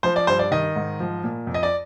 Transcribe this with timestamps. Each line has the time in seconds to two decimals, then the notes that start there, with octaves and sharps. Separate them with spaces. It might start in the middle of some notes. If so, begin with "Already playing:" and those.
0.03 F3 C5
0.16 D5
0.27 G2 C5
0.39 D5
0.51 D#3 D#5
0.76 G#2
1.00 F3
1.24 A#2
1.47 F2
1.54 D#5
1.63 D5